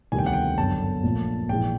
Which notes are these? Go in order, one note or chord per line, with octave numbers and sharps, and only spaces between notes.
E1 D2 C3 D#3 G3 G#5
G5
F#5
G5
G1 F#2 D3 A5
A#1 A#2 F3 A3
A#1 G#2 E3 G#3 G5